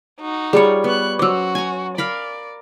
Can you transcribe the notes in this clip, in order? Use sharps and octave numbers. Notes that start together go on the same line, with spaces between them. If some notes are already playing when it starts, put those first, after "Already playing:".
D#4 F#4
G3 F4 G#4 C#5 B5
B3 C#6 F#6
F#3 C#4 F#4 C5 D6 E6
G#5 A#5
A#4 D5 F5 B5